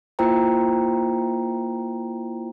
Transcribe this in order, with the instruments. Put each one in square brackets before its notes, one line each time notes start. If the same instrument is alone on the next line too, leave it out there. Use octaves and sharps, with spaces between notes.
[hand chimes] A#3 E4 F4 C5 G5 A#5